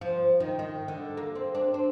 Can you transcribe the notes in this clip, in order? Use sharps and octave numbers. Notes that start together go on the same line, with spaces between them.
F3
D#3
D#3
D3
A#3
C4
D4
C4